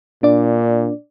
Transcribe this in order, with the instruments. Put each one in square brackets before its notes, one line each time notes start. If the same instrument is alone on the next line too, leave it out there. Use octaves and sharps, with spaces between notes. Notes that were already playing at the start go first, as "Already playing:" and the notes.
[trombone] A#2 [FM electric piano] D4 D5